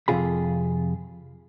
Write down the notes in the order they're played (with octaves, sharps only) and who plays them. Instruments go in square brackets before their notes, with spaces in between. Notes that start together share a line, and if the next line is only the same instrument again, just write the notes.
[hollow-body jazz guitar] F2 G#2 C3 F4 G#4 B5